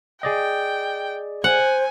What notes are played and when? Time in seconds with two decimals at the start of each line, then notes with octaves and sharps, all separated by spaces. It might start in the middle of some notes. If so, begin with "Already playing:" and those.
0.23 G#4 D5 D#5 G5
1.44 C5 F#5 G#5